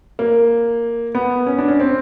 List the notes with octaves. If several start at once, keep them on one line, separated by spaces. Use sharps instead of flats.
A#3
B3
C#4
D4
C#4
C4